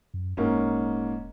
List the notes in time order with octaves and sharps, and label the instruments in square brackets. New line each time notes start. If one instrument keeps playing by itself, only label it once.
[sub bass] F#2
[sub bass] D#1 [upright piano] G#2 A#3 C#4